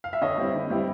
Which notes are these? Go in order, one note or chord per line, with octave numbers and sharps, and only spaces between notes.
F5
E5
D3 C#5 D#5
G3 C4 E4
D3
G3 C4 E4